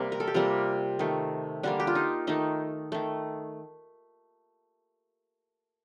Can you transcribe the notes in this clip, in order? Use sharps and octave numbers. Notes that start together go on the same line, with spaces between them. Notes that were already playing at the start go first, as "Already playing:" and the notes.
Already playing: C3 G3 A#3
A#4
A4
G4
C3 G3 A#3 F4
D#3 A3
D3 G3 A#3 D4
G4
F4
D#4
D#3 A3 D#4
D#3 A3